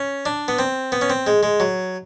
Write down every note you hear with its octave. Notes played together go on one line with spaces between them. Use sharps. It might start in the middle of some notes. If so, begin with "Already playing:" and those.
Already playing: C#4
D4
B3
C4
B3
C#4
C4
G#3
G#3
F#3